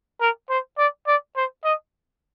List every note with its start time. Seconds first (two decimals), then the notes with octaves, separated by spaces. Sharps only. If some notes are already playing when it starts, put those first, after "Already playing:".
0.21 A#4
0.50 C5
0.78 D5
1.07 D5
1.36 C5
1.65 D#5